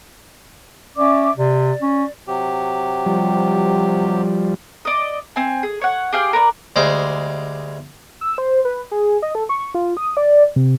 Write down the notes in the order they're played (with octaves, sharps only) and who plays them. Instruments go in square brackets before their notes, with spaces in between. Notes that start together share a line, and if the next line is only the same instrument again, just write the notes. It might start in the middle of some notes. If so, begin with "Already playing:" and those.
[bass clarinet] C#4 [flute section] D5 E5 D6
[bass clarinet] C3 [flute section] D5
[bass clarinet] C#4
[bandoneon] C3 F#3 G4
[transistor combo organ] F3 G3
[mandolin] D5 D#5
C4 G#5
G#4
C#5 F#5
G4 G#4 F5 G5
A#4 B4 C#5 D5
[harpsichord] D2 G3 G#3 C5 G5
[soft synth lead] E6
C5
B4
G#4
D#5
A4
C#6
F4
D#6
D5
C3